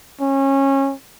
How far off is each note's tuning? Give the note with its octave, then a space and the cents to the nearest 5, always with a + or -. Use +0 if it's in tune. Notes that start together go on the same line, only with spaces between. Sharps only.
C#4 -25